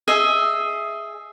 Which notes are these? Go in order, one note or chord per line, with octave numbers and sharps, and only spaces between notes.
G#4 D#5 E5